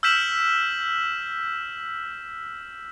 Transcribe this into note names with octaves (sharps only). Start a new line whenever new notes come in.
E6 F6 G6 B6 E7 F#7